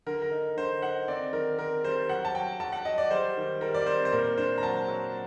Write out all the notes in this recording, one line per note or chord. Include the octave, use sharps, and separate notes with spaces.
D3 A#4
A#4
D#4
D3 C5
D#4 F#5
C4 D5
D#3 A#4
C4 A#4
G3 C5
F#3 F#5
A5
F#3 G5
F#3 A5
F#5
F#3 D#5
D5
G3 C5
D#3
G3 A#4
D5
C4 C5
C5
A#2 A#4
D4 C5
A#5
F#3 A5
F#3